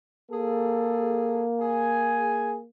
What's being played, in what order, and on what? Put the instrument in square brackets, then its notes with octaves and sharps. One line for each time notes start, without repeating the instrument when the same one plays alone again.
[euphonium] A#3 [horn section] G#4 A4
[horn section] G#4 G#5